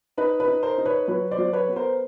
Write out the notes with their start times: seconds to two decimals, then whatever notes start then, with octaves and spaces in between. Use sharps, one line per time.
0.18 D#4 B4
0.40 B4
0.48 D#4
0.63 A#4 C5
0.78 D#4
0.85 B4 C#5
1.08 F#3 B4 C#5
1.31 C5 D5
1.38 F#3
1.53 B4 C#5
1.68 B3
1.76 A#4 C5